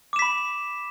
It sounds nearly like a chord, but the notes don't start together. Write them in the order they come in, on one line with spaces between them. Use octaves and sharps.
D6 E7 B6 B5